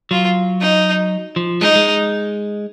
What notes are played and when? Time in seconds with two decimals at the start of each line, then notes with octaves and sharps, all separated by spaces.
0.11 F#3 F4
0.61 D#4
1.36 F3
1.61 G#3 D#4
1.76 G#3